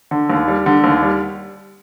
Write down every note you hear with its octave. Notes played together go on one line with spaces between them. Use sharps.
D3
D#2
G3
D3
D#2
G3